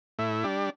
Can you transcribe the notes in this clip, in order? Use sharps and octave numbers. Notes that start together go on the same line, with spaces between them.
A2 E4
G3 D4